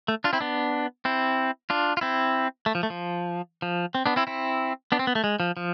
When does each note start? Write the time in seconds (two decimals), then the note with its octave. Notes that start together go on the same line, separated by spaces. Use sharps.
0.08 A3
0.24 D4 F4
0.33 C4 E4
0.41 B3 D4
1.05 C4 E4
1.70 D4 F4
1.97 F4
2.01 C4 E4
2.66 A3
2.75 F3
2.83 A3
2.90 F3
3.62 F3
3.95 C4
4.06 B3 D4
4.16 C4 E4
4.27 C4 E4
4.92 B3 D4
4.99 C4
5.07 B3
5.15 A3
5.24 G#3
5.40 F3
5.57 F3